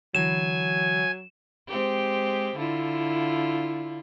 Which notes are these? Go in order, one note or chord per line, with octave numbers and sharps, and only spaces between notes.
D3 E3 F#3 G#5 E7
G#3 C4 G4
D3 E4 F4